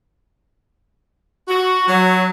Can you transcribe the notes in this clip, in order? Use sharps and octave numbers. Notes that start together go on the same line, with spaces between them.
F#4
F#3